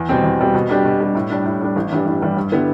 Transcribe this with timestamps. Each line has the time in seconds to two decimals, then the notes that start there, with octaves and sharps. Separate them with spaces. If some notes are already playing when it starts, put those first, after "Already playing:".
Already playing: E2
0.09 B2 G3 C4
0.24 E2
0.39 B2 G3 C4
0.54 B2
0.69 G3 D4 G4
0.85 B2
1.00 G3 D4 G4
1.15 A2
1.30 G3 D4
1.45 A2
1.61 G3 D4
1.76 A1
1.91 G2 E3 G3 D4
2.06 A1
2.21 G2 E3 G3 D4
2.37 G2
2.52 D3 G3 B3 E4